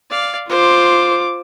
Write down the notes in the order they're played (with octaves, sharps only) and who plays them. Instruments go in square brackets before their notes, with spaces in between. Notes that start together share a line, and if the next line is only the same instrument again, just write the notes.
[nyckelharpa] D5 F5
[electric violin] F4 D6 [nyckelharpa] C5